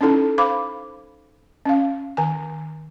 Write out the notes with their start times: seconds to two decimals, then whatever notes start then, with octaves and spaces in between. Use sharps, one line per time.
0.01 C#4 D#4 E4 A4 A5
0.38 C5 F5 B5 D6
1.65 C#4 F5
2.17 D#3 G#5